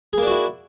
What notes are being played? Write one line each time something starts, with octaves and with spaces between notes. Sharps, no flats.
A#3 D4 E4 F#4 G#4